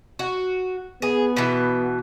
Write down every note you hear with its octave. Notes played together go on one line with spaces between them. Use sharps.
F#4
B3 G#4
B2 E3